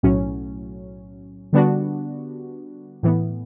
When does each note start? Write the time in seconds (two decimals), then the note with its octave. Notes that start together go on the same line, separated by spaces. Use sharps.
0.03 B1 A2 F#3 C#4
1.53 D3 G3 B3 D4 F#4
3.03 A2 E3 B3